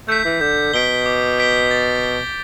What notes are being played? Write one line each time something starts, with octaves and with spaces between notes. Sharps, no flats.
A3 G6 B6
E3
D3 G6
B2 B6 D7 G7
D6
G6 B6 D7 G7
A6
G7